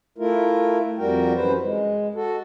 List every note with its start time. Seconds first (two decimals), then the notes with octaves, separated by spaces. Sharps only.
0.18 A3 E4 F4 A#4
0.99 F2 G3 F#4 A#4 G5
1.34 F#2 E3 B4 C5
1.63 G#3
2.15 F#4 A4